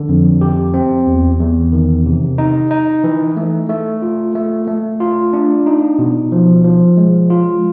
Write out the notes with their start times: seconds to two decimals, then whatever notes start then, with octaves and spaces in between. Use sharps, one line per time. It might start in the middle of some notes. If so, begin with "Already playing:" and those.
Already playing: D3
0.09 F2
0.41 G4
0.74 C4
1.07 E2
1.39 E2
1.72 D#3
2.06 C3
2.38 D#4
2.71 D#4
3.04 E3
3.37 A3
3.69 A3
4.02 F4
4.35 A3
4.68 A3
5.00 F4
5.33 D4
5.66 D#4
5.99 B2
6.32 F3
6.64 F3
6.97 G#3
7.30 F4